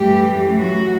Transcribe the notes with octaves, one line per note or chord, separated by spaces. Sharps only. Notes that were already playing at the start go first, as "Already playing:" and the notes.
Already playing: F#2 E3 G3 A3 G4
F#3 F#4